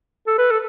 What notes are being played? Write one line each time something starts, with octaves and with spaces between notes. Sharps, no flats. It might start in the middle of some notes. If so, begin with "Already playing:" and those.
A4
B4
A4